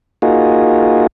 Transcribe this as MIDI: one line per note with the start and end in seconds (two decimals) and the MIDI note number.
0.22 1.07 58
0.22 1.07 63
0.22 1.07 65
0.22 1.07 66
0.22 1.07 68